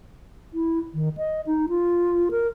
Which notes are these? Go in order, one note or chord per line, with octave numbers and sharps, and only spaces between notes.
E4
D#3
D#5
D#4
F4
A#4